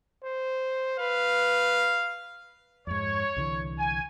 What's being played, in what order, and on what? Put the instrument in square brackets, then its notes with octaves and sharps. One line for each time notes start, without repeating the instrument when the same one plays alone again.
[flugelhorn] C5
[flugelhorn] B4 [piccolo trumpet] F5
[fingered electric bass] F2 G#2 [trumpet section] C#5
[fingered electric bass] C2 D3 E3
[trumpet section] G#5